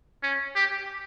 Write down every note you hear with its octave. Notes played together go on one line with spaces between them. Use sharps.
C#4
G4